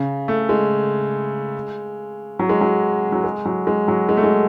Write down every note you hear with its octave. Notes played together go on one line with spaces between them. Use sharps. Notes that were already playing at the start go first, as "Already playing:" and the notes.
Already playing: C#3
A3
G#3
F#3
G#3
F#3
F#3
G#3
F#3
G#3
F#3
G#3
A3
G#3